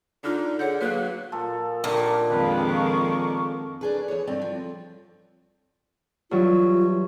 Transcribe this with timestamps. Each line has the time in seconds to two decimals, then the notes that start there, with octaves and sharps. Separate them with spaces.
0.24 D3 D4 D#4 F4
0.59 D3 G#4 C#5 F#5 G6
0.81 F#3 A#3 B4 F#6
1.32 A#2 F3 A4
1.84 A#2 D3 D#3 F3 D#4 G4 A#5
2.30 F2 D#3 G#3 D4 F4 B4 F5 G5
2.72 A#4 C#6
3.81 D4 G#4 B4
4.08 E2 C#5
4.27 G2 D3 C4 D5
4.42 F3
6.31 G2 E3 F#3 F4